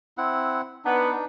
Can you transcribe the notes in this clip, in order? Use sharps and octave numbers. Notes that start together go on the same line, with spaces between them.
C4 E4 F#5
B3 D4 D#4